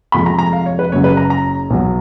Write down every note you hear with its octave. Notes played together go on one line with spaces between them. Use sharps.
F1 F2 F3 G#3 B5
A#5
A#5
F5
C#5
B4
F#1 F#2 C#3 F#3 C#5
B4
A#5
A#5
B1 B2 F#3